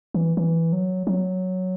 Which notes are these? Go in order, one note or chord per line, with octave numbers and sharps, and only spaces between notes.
E3
E3
F#3
F#3